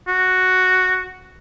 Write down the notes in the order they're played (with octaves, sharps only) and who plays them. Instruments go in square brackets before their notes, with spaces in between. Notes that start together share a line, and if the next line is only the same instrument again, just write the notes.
[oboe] F#4